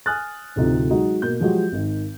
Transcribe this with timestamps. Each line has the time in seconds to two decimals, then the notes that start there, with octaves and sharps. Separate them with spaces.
0.06 G#5 D#6 F6 F#6 A6
0.56 D1 D2 C3 D#4 F4
0.90 F#3 G#3 D#4 F#4
1.22 B2 A#3 G6
1.40 F3 F#3 G#3 F#4 G4
1.72 G#1 D#3